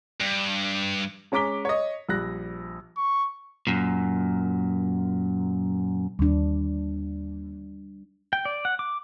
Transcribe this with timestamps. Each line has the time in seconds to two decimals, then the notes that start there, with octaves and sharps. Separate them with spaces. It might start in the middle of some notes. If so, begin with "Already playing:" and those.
0.21 G2
1.32 G#3 C#4 A#5 D6 B6 G7
1.65 C#5 D#5
2.09 A#1 G3 F#6 A#6
2.97 C#6
3.67 F#2 A#2
6.19 D#2 G3 D4
8.33 G5
8.45 D5
8.65 F#5
8.79 D6